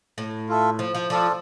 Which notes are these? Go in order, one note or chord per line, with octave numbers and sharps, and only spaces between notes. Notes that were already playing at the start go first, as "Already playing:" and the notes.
A2
F4 A4 E5
F3
F3
F3 F4 A4 D5